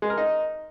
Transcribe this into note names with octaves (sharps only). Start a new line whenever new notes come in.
G#3
A#4
D#4